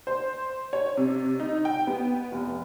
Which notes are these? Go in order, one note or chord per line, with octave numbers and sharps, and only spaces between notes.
C5
C#5
C3
D#4
G5
B3
F1